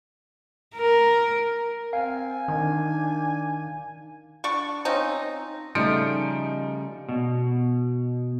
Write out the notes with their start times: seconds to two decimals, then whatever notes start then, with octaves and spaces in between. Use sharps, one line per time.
0.76 A#4
1.93 C4 F5 G#5
2.48 D#3 D4
4.44 D4 D5 C#6
4.85 F3 C4 C#4 D#4
5.75 C#3 F3 G3 A3 D#4 C#7 D7
7.09 B2